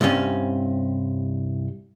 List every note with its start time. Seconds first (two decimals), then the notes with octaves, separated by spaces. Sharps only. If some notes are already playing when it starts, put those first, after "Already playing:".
0.01 C2 G2 C4 C#4